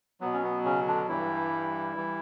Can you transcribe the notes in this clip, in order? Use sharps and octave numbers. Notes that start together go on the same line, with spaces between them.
B2 F#3 B3
C#4
B3
C#3 C#4
D3 D4
G2 E3 G3 E4
E3 G3